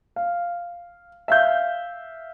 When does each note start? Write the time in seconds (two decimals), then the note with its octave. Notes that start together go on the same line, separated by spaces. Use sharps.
0.16 F5
1.28 E5 F5 G6